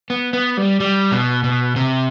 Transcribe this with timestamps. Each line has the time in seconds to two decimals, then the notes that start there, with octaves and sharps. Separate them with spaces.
0.10 B3
0.33 B3
0.57 G3
0.80 G3
1.12 B2
1.44 B2
1.76 C3